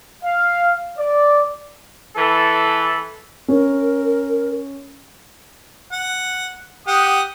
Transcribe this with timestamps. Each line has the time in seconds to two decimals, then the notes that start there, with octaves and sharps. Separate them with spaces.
0.23 F5
0.97 D5
2.17 E3 A4
3.48 C#4 A#4
5.92 F#5
6.87 G4 F#5 D#6